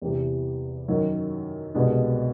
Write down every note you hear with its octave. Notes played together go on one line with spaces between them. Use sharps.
E2 C3 E3 G3
F#2 D#3 F#3
C2 B2 G#3 B3 D4